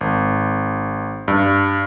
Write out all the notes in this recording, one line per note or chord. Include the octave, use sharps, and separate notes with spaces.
G#1
G2